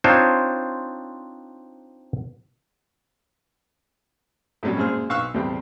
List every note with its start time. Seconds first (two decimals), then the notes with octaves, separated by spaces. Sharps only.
0.04 C4 D4 D#4 F4 C5 C#5
4.63 A2 C3 F#3 G3 C#4
4.77 F#2 A#2 G#3 G#4 C5 F6
5.10 B1 F5 C#6 E6 F#6
5.34 E2 A2 G3 C4